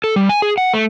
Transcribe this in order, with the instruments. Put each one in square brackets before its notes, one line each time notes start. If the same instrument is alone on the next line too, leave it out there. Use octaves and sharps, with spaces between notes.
[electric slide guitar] A4
G3
G#5
G#4
F#5
A3